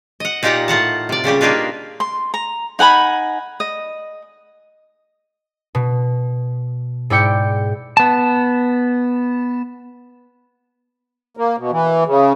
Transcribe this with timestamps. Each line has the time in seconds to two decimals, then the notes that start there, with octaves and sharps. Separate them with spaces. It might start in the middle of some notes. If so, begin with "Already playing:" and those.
0.20 D#5 F#5
0.43 A#2 D#4 F4 G4 F#5 A#5
0.68 A2 F4 F#5 A5
1.09 C3 D5
1.24 A#2 C#3 G3 G4
1.41 A#3 D4 D#4 F4 B4
2.00 C6
2.34 A#5
2.79 D#4 F#5 G#5 B5
3.60 D#5
5.75 B2
7.10 G#2 E4 D5 G5 C#7
7.97 B3 A5
11.37 A#3
11.58 B2
11.72 E3
12.06 C#3